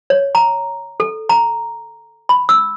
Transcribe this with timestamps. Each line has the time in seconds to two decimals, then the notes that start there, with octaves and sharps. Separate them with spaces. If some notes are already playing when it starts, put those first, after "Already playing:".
0.10 C#5
0.35 A#5
1.00 A4
1.29 A#5
2.29 B5
2.49 E6